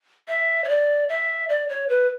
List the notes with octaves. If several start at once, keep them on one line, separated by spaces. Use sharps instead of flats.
E5
C#5
D5
E5
D5
C#5
B4